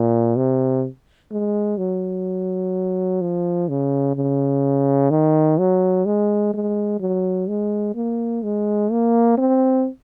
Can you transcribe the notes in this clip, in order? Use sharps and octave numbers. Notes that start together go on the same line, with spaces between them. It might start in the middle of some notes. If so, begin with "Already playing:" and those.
Already playing: A#2
C3
G#3
F#3
F3
C#3
C#3
D#3
F#3
G#3
G#3
F#3
G#3
A#3
G#3
A#3
C4